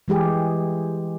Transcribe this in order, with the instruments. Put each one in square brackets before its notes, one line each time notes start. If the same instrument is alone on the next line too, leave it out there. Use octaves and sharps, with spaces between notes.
[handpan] E3 G#3 G4 G#4